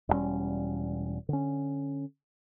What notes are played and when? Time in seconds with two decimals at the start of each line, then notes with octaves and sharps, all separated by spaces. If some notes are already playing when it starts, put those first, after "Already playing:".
0.09 E1 G2 G3 C#4
1.29 D3 C#4